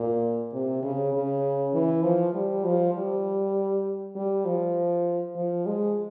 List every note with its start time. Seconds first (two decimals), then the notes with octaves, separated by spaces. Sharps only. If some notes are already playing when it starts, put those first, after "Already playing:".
Already playing: A#2
0.53 C3
0.83 C#3
1.13 C#3
1.74 E3
2.03 F3
2.34 G3
2.64 F3
2.94 G3
4.15 G3
4.45 F3
5.36 F3
5.66 G#3